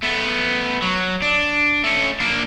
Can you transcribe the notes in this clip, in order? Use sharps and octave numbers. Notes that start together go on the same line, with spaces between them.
A3 B3
F#3
D4
A3 C#4
A#3 D4